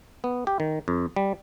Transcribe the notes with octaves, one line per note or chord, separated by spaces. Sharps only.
B3
G4
D#3
F2
G3